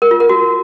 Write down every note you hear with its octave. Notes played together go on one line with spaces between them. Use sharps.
A#4
F4
A#4
F#4